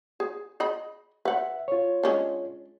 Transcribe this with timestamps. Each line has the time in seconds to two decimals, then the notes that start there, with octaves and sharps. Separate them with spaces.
0.20 G#4
0.60 G#4 D#5 B5
1.25 B4 E5 F#5
1.68 F4 C#5
2.03 G#3 C#4 D4